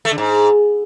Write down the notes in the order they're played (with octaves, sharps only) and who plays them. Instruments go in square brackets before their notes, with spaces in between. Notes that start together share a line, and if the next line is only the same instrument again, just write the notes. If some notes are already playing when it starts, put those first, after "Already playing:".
[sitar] A3
D3
G#2